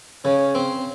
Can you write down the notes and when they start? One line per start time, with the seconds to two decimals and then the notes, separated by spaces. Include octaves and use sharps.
0.25 C#3 C#4
0.55 C4